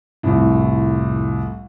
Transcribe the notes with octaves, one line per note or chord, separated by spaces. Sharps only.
C2 F2 A2